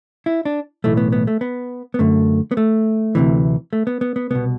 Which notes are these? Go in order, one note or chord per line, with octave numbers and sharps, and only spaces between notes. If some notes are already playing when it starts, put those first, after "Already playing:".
E4
D4
B1 A2 E3 A3
B3
B3
A3
B3
B3
F#2 D3 A3
B3
A3
D2 C3 E3
A3
B3
B3
B3
C2 B2 B3